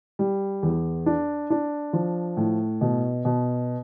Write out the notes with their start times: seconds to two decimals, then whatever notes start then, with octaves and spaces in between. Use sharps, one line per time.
0.19 G3
0.63 E2
1.06 D4
1.50 D4
1.93 F3
2.37 A2
2.81 B2
3.25 B2